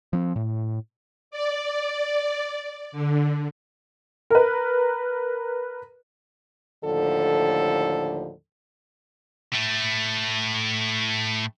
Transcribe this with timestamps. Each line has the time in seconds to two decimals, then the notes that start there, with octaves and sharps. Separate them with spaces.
0.13 F3 C4
0.36 A2
1.31 D5
2.92 D3
4.30 A#4 B4
6.85 D#2 A2 D3 F3 A4
9.53 A2 A3